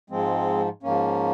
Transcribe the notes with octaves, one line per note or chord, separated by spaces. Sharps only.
G#2 F3 G#3 C4
G#2 F3 A#3 C#4